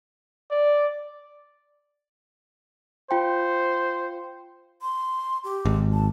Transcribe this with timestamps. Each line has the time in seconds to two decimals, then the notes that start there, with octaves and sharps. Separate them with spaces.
0.51 D5
3.11 F4 C5 G5
4.82 C6
5.44 G4
5.65 G#1
5.93 A5